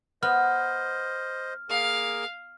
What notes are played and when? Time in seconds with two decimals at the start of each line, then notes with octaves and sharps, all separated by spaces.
0.23 B3 C5 D#5 F6
1.70 A#3 G#4 A#4 F5